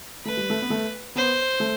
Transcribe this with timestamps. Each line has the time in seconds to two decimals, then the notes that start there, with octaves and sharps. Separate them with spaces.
0.25 A3 B4
0.37 G3
0.50 A3
0.62 B3
0.70 A3
1.16 B3 C5
1.60 A3